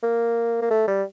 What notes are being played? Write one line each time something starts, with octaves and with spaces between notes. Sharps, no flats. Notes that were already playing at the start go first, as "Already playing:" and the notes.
A#3
A#3
A3
G3